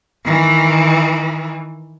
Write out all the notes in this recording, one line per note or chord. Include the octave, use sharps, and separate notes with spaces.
D#3 E3